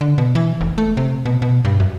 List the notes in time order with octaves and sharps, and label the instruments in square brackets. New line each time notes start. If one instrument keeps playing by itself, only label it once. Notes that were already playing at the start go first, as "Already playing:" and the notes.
[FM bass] D3
B2
E3
F1
A3
C3
B2
B2
G2
F#2